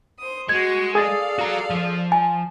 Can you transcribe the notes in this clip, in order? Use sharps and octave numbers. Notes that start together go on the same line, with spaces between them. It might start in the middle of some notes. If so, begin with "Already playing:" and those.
C5 D#6
G#3 F#4 C#6 G#6
G#4 A4 D5 F5 D#6 A6
F#4 A#5
F3
G#5 A5